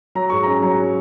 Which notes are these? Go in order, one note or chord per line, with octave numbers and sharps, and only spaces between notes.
F#3 A#5
G#2 C#6
A#5
C#4
F#3 A#5